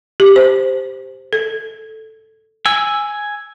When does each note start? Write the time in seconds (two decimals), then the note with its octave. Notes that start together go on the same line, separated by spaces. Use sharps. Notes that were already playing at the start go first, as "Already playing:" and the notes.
0.20 G4
0.36 C5
1.33 A4
2.66 G#5 E6